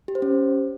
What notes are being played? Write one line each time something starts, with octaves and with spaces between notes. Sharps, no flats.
G4
C5
C#4